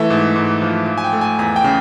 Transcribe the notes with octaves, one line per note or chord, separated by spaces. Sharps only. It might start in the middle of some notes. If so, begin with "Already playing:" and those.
Already playing: E3 A3 E5
G#2
G#2
F3
F3
G#5
G5
A3
G#5
E2 G#5
G5
C#3